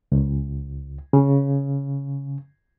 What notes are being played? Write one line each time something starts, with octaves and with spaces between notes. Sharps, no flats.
C#2
C#3